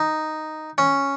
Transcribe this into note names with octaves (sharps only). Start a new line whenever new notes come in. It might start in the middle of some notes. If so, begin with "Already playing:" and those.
Already playing: D#4
C#4